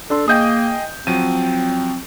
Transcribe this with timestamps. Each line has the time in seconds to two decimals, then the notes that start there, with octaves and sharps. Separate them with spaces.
0.10 D4 A4 C6
0.28 A#3 G#4 D#5 G5 D#6 G6
1.07 F3 F#3 C4 D#7